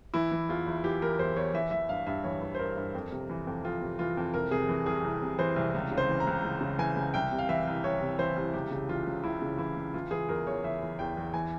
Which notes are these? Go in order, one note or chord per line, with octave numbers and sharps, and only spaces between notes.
E3 E4
E3
E2 F4
E2
E3 G4
E3 A#4
E2 C5
E2 C#5
E3 E5
E3 E5
G2 F5
G2 E5
E3 C#5
E3
C5
G2 A#4
G2
F2
C3
E3
F2
F2 F4
C3
E3 F4
F2
C2 A#4
C3 G#4
E3
C2 G#4
C2
C3
E3 C5
C2
C#2
C#3
C5
E3
A#5
C#2
C#2
C#3
E3 G#5
C#2
C2 G5
C3
F5
E3 E5
C2
C2 C#5
C3
E3 C5
C2
C#2 G4
C#3
E3 F4
C#2
C#2 E4
C#3
E3 E4
C#2
E3 F4
E3 G#4
E2 A#4
E2 C#5
E3 E5
E3
E2 G5
E2
E3 G#5